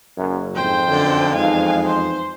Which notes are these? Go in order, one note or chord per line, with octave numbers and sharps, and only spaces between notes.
F#1 F#2
F2 G#2 C5 G5
B1 F#2 D3
E2 F3 G#3 D#4 F5 G#5
C5 C6